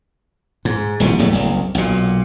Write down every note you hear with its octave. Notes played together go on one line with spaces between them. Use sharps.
G#2
D#1 C2 B2 F3
D#1 A2 F#3 A3
F#1 C2
B1 A#2